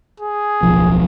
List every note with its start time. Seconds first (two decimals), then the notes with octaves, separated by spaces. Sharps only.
0.20 G#4
0.63 D1 B1 F3